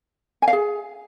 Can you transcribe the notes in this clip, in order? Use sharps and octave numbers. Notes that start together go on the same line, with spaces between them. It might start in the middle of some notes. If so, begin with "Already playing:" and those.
G#5
F5
G#4